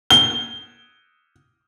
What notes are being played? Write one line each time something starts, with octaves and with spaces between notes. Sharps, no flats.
G7